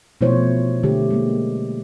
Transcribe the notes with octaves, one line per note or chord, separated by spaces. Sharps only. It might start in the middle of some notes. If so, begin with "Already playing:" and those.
B2 F3 A3 E4 C5 C#5
D3 A3 G4
G#3 A#3